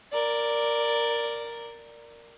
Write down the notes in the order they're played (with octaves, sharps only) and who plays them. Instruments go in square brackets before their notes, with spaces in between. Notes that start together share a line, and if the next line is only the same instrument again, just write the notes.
[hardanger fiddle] A#4 D5